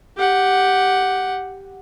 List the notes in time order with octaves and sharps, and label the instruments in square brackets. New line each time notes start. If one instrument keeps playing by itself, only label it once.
[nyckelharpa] G4 F#5